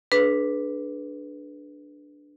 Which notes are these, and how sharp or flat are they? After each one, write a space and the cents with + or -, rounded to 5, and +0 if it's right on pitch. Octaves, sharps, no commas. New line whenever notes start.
D4 +0 G#4 +40 B4 +0